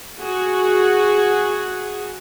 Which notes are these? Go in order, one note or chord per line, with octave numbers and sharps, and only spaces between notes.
F#4 G#4